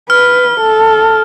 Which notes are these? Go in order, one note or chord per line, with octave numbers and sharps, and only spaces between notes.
B4 F6
A4